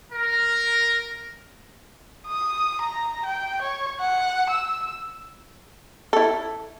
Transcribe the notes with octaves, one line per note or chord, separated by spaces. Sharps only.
A#4
D#6
A#5
G5
C#5
F#5
E6
E4 A4